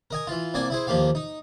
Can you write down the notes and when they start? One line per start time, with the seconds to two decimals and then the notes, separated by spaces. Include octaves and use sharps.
0.11 A#4 D#5 G#5
0.27 E3 F4
0.54 C2 A#3 D5 G#5
0.70 E4 G#4 C5
0.87 D#2 F3 A#3 G4 F5
1.15 D#4